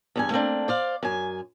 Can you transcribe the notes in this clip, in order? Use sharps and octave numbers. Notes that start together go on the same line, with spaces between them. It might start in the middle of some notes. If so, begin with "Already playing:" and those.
E2 G2 G#5
A3 A#3 C4 D4
C5 D5 F5
F#2 G#5